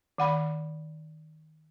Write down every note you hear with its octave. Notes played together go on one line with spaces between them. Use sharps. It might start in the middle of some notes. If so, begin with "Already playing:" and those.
D#3 F#5 B5